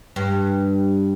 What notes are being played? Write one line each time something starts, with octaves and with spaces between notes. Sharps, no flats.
G2